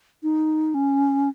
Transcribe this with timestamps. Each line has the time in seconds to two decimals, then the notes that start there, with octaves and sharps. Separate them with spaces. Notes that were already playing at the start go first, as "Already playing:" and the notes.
0.23 D#4
0.74 C#4